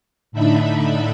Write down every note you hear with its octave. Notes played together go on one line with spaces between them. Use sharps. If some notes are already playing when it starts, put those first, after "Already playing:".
A2 D3 D4 D#4 E5 B5